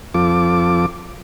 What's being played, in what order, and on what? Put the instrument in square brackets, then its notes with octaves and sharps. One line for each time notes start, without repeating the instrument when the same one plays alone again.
[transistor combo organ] F2 F3 C4 F4 A4 D6